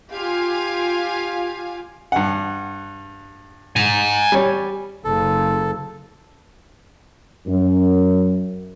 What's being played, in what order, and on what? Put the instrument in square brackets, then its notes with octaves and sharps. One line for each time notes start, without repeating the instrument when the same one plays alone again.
[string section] F4 G4 F5 G#5
[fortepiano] G2 F#5
[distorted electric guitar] G#5 A#5
[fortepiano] G3 C#5
[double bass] F#1 C#3 [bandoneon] A4
[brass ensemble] F#2